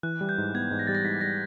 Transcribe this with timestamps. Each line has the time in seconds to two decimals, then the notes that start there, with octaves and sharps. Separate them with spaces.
0.03 E3 F#6
0.21 G3
0.29 G6
0.38 G#2
0.54 B3 G#6
0.71 G#2
0.79 A#6
0.87 G3 A6
0.95 A#6
1.04 G#2 B6
1.21 G3 A#6